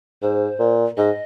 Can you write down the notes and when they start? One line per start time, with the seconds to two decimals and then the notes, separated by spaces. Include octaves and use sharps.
0.22 G#2 C5
0.59 A#2
0.97 G#2 D#5